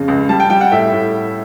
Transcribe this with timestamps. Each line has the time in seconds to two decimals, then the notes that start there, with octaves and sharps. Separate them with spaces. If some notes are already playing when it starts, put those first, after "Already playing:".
Already playing: F2 C#3
0.08 C#2
0.29 G3 A5
0.40 G5
0.50 G3 G5
0.61 F#5
0.71 A2 E5
0.93 A2